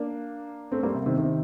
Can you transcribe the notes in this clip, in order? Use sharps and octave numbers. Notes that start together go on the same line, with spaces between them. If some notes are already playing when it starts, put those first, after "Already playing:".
Already playing: A#3 D4
A3 C4
G3 A#3
C3
C3 D#3
C3 D#3